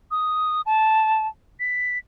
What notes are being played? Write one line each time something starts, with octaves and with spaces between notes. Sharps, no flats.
D#6
A5
B6